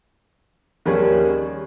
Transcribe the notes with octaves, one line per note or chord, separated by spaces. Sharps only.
D#2 D#3 G3 C#4 G#4